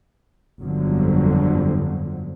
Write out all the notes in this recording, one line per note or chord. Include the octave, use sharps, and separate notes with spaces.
G1 F2 D3 F3 F#3